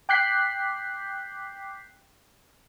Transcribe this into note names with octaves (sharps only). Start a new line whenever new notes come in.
G5 D6 F#6 G6 B6 C7